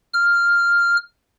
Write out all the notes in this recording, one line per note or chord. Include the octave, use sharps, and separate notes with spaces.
F6